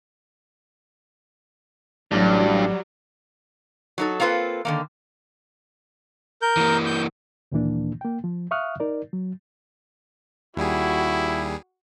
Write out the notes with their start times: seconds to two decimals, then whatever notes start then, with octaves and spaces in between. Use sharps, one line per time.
2.12 A1 G2 F#3 G3 D4
3.98 F#3 D#4 A4
4.20 A#3 C4 F4 A4 B4
4.65 D3 D#3 A#3
6.42 A#4 G6
6.57 E3 A#3
6.86 G6
7.52 D2 A#2 D#3 E3 A#3 D4
8.01 A#3 G5
8.24 F3
8.51 E5 F5 C#6 D#6 F6 F#6
8.80 D#4 A#4 D5
9.13 F#3
10.57 D#2 G3 E4 F#4 G#4